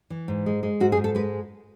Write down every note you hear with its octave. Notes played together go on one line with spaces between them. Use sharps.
E3
G#2
G#3
G#3
G#2 F#4
G#4
G#2
A4
G#3 B4